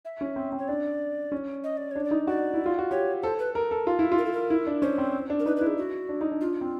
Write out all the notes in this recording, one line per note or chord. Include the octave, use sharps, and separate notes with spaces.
E5
C#4
C4
C4
C#5
D4 D5
C#4
D#5
D5
D4 C#5
D5
D#4
F#4 D5
E4
F4
F#4
G4 C#5
A4 C5
B4
A#4
A4
F4
E4
F4
A#4
A4
A#4
E4
D4
C#4 C5
C4
D4
A#4
D#4 B4
B4
E4
G#4
F#4
D4
D#4
D4
F4
C4